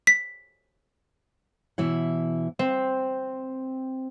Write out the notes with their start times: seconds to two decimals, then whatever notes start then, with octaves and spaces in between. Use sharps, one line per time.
0.07 B6
1.78 B2 E3 E4 C#5 F#5
2.59 C4